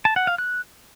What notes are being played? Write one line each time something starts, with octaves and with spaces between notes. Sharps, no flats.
A5
F#5
F5
F#6